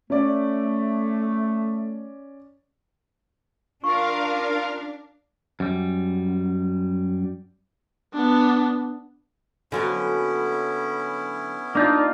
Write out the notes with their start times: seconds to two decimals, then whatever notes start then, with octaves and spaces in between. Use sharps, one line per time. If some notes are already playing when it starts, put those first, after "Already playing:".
0.10 A3 C#4 D5
3.84 D4 F4 A#4 F5 C#6
5.60 F#2 G3
8.14 B3 D4
9.72 D3 F#3 A#3 B3 C#4 E4
11.75 A#3 D4 D#4 F4